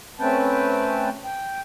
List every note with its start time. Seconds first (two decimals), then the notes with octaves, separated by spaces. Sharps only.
0.20 A3 C4 C#4 B4 G5 A5
1.24 G5